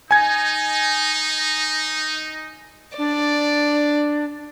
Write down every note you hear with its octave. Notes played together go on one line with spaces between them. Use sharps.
D#4 G#5 G#6
D4 D5